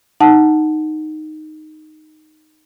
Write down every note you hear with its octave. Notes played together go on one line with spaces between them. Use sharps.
D#4 F#5 A5